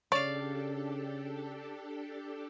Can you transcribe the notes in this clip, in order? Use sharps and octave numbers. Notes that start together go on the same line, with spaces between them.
C#3 D4 G4 A4 C#5 D5 F5